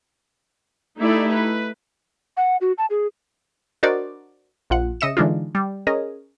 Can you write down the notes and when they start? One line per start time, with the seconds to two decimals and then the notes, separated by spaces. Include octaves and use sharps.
0.99 A3 D#4 E4 G4 D5 E5
1.32 B4
2.37 F#5
2.61 F#4
2.78 A5
2.90 G#4
3.83 D4 F#4 A#4 C5 D5 D#5
4.70 A#1 F4 F#5
5.01 C#3 D#5 E5 C#7 E7
5.17 D3 E3 G#3 D4 D#4 F4
5.55 G3
5.87 C#4 G#4 A#4 D#5